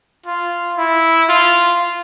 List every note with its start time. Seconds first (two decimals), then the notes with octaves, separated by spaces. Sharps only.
0.26 F4
0.78 E4
1.29 F4